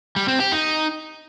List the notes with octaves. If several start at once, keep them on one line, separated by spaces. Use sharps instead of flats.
G3
C4
G4
D#4